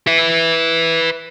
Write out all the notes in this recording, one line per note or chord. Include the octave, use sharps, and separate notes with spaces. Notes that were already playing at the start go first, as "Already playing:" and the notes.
B4 E5